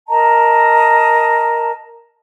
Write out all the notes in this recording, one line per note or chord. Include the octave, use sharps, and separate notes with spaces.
A#4 D#5 A5 A#5